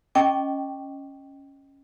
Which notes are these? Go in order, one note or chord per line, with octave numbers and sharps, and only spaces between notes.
C#4 D#5 G5 A5 C#6 D6